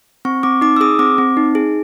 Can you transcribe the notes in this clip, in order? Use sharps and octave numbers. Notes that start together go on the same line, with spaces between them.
C4 C#6
C4 D6
D#4 D6
E6
G#4 D#6
C4 D6
C4
D#4
G#4